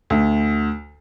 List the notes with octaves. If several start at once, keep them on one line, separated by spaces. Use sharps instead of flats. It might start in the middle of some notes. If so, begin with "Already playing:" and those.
D2